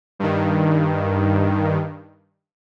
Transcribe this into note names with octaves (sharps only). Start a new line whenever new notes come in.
G2 D#3